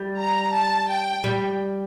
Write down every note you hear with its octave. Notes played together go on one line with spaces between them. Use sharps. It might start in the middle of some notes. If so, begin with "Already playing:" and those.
Already playing: G3
A#5
A5
G5
G3